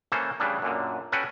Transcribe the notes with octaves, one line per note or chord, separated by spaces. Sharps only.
E3 A#3 C#4 A4 C5
C#3 E3 G3 A3 D4
F#2 A#2 D3
C#4 F#4 A4 B4 F#5 G5